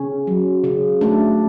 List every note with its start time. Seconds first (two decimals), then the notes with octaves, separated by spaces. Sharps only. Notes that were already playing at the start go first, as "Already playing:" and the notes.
Already playing: C#3 C#4
0.27 F#3
0.64 C#3
1.01 A3 D4